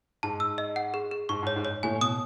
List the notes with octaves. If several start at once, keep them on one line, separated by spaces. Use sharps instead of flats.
G#2 A5
E6
D#5
F#5
G#4
G#4
G#2 C#6
G#2 C#5
G#2
C#5
A2 G#5
B2 D#6